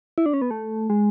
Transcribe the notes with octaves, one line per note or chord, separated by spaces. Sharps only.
E4
D4
C#4
B3
A3
G#3